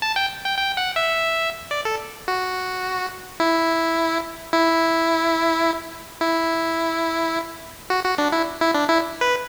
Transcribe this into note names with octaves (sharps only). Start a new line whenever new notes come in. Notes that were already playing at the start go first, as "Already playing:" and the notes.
A5
G5
G5
G5
F#5
E5
D5
A4
F#4
E4
E4
E4
F#4
F#4
D4
E4
E4
D4
E4
B4